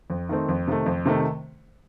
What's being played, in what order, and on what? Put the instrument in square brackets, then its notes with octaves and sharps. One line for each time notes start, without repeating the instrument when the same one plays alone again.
[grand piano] F2
D#3 A3 C4 D#4
F2
C3 D#3 A3
F2
C3 D#3 A3